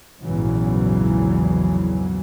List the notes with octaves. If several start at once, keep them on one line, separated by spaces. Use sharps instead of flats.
A#1 E2 G#2 C#3 E3 F#3